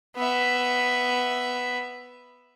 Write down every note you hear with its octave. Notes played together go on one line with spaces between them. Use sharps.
B3 E5